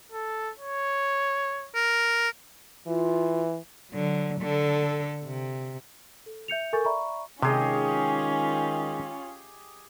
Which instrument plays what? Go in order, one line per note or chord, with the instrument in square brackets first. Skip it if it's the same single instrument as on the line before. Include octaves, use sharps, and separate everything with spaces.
[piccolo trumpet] A4
C#5
[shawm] A#4
[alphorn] E3 [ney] F4
[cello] D3 F#3
D3 A4
C3
[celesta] A4
E5 G6 C#7 F7
A4 A#4 G#5 C#6 G6 A6
D5 E5 A#5 B5 C#6
[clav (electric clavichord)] C3 [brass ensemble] D#3 G#3 [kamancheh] C#4 F4 [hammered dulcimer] G4 G#4 D#5